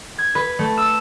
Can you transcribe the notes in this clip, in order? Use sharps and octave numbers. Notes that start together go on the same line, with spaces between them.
G#6
B4
A3
E6